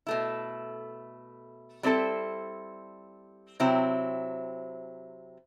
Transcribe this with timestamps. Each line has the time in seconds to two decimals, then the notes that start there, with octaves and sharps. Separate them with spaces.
0.07 B2 A3 E4
1.83 G3 C4 E4 A4 C5
3.60 C3 F#3 C4 E4